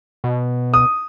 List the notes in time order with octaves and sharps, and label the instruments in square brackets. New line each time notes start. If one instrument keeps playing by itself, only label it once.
[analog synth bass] B2
[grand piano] D#6